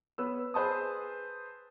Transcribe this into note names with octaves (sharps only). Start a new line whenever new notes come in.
B3 B4 C#5 E6
G#4 B4 C5 A5 D#6